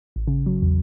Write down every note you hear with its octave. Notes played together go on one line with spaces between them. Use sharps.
A1
C#3
F#3
E2